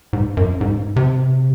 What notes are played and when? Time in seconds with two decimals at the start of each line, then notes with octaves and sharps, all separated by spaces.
0.13 G#2
0.37 F#2
0.61 G#2
0.96 C3